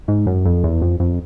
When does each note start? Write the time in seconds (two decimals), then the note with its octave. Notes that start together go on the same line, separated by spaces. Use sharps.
0.08 G#2
0.27 F#2
0.45 F2
0.64 E2
0.82 F2
1.00 F2